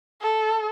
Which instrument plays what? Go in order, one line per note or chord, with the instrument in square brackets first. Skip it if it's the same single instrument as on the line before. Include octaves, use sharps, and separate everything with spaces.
[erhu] A4